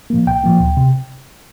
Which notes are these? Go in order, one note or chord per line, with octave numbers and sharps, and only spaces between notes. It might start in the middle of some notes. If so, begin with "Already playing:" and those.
A#2 F3 A#3
C2 G5
A#2 F3 A#3
D2
C3